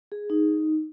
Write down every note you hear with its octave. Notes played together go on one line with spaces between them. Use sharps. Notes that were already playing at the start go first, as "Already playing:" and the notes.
G#4
D#4